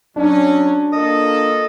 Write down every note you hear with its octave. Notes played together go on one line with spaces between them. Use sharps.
F#3 C#4 D4
A#3 F4 A4 D#5